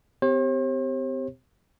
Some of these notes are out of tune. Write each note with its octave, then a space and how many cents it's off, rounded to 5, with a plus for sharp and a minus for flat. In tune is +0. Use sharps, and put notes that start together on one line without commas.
C4 -35 G4 +0 C5 +45